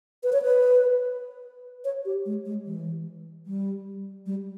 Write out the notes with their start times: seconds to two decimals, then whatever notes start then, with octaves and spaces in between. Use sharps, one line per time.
0.24 B4
0.33 C#5
0.42 B4
1.85 C#5
2.05 G4
2.26 G#3
2.45 G#3
2.66 E3
3.46 G3
4.26 G3